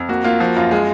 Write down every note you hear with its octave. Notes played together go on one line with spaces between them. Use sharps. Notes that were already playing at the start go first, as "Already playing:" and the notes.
Already playing: F2
A#3 F#4
A#3 F4
F3 F#4
F#2 F4
G#3